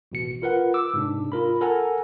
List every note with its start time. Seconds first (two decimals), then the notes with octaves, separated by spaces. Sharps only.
0.12 A1 B2 C#7
0.42 F4 A#4 B4 F#5
0.74 D6 E6
0.94 G#2 C3 D4
1.32 F4 A#4 B5
1.61 A4 A#4 F#5 G#5 A#5